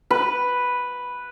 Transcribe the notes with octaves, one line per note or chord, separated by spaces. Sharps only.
B4